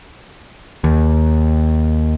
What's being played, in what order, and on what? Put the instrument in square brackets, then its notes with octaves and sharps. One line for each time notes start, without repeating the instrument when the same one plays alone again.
[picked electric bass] D#2